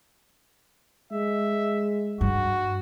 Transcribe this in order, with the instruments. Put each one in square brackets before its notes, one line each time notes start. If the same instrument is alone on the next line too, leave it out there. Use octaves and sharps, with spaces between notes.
[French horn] G#3 [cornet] E5
[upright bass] G2 [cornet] F#4